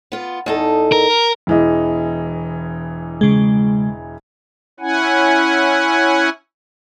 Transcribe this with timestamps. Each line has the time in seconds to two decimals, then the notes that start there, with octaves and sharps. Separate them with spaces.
0.12 B3 F4
0.46 E2 D#4 A4
0.92 A#4
1.47 E1 E3 D#5
3.21 C#3 G#3
4.80 C#4 E4 F#5 G#5